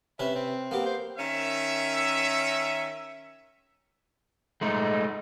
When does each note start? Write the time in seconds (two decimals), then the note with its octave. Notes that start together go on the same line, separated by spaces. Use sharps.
0.19 C3 C#4 B4 E5
0.35 C4
0.71 A#3 B3 G4
0.86 C5
1.18 D#3 C#4 E5
4.61 G#3 A3 D#4